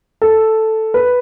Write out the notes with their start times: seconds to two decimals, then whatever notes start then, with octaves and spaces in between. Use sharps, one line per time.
0.22 A4
0.94 B4